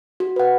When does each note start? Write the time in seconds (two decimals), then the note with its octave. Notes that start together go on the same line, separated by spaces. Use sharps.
0.20 F#4
0.36 B4 F#5